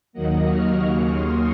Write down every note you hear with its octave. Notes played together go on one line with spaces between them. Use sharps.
D#2 D#3 F#3 A#3 D#5 F#5
C#6 F6
D#2 C#3 F#3 A#3 C#6 F6
C6 D#6